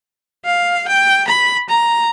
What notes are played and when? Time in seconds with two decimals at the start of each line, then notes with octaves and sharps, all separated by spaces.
0.45 F5
0.88 G5
1.28 B5
1.69 A#5